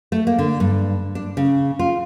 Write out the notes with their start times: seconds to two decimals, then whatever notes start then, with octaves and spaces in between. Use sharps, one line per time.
0.12 A3
0.27 A#3
0.39 D3
0.60 G2
1.15 D4
1.37 C#3
1.79 F4